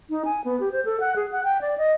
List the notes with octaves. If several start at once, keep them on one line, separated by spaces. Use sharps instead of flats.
D#4
G#5
B3
G4
C5
A4
F#5
G#4
F#5
G5
D5
D#5